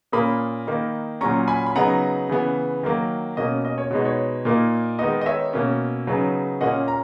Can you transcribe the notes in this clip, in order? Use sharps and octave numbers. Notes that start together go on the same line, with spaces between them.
A#2 A#3 C#4 B5 D#6
D#3 A#3 D#4
A#2 F#3 C#4 A#5 C#6
G#5 B5
B5
C#3 F#3 B3 D#4 F#5 A#5
C#3 E3 B3
D#3 F#3 A#3
B2 A#3 C#4 D#5
D#5
C#5
B2 G#3 B3 D#4
C#5
A#2 A#3 D#4
D#3 G#3 B3 D#4 D#5
D#5
C#5 E5
B2 A#3 C#4
C#3 F#3 B3 D#4
A#2 A#3 C#4 D#5 F#5
A#5